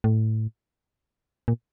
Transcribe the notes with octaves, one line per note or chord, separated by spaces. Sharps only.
A2
A#2